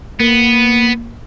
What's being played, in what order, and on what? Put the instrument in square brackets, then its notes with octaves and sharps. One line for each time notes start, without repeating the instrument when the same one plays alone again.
[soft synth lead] A#3 [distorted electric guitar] B3